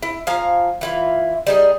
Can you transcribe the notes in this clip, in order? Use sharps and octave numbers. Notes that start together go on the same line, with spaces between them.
E4
F3 F5 G#5 A#5
E3 E4 F4
G3 D#4 G#4